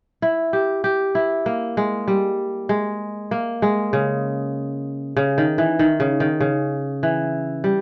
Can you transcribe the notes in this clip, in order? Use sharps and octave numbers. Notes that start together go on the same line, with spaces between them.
E4
G4
G4
E4
A#3
G#3
G3
G#3
A#3
G#3
C#3
C#3
D#3
E3
D#3
C#3
D#3
C#3
E3
G3